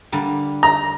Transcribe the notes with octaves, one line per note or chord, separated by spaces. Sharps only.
D3 G3 A#3
A#5